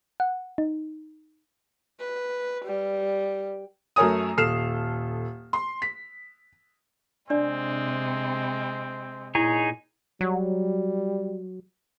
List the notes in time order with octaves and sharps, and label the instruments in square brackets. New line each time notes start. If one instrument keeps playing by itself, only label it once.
[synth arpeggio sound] F#5
D#4
[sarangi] B4
G3
[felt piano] F#2 A3 A#4 C#5 G#5 D#6
D#1 A4 F6 C7 E7
C6
B6
[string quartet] C3 G#3 [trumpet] C4 [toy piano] D4 D5
[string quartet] A#2 [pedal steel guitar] D#4 G#4 C#5 [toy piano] E4
[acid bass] F#3 [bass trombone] G3